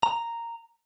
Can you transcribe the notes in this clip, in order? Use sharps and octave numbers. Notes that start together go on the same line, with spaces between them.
A#5